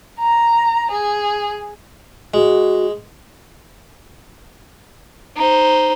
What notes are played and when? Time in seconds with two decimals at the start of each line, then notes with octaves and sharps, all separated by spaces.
0.19 A#5
0.92 G#4
2.34 G#3 F#4
5.36 D#4 C5